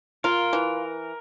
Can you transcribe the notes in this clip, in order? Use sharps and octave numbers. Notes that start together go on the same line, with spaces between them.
F4 A#4
E3